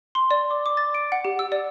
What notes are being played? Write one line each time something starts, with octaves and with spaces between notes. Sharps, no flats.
C6
D5
D6
D6
A6
D7
F#5
G4
E6
D5